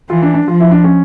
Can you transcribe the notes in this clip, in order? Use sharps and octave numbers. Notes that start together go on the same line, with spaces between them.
E3 F4
D4
D4
F3 F4
E4
D4
C#4